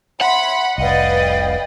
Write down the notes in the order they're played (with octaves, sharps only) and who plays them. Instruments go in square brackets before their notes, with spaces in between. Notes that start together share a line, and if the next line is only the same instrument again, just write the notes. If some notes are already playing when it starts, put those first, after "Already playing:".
[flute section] C#5 E5 C6 [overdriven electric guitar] F#5 [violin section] B5
[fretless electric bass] F1 C2 [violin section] B4 D#5 [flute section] D5 F5 G5